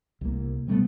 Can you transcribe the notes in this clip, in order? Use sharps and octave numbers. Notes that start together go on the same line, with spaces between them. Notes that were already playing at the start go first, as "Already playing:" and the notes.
C2 A#3
C3 G3 A3 B3